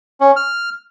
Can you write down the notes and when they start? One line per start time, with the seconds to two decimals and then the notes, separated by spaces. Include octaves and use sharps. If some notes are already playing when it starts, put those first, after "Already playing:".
0.21 C#4
0.36 F6